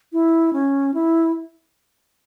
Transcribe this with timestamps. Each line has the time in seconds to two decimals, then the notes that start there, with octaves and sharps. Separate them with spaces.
0.13 E4
0.53 C#4
0.94 E4